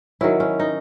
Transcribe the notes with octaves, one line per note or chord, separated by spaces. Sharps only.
D#3 F#3 C#4 E4
C#4
D#4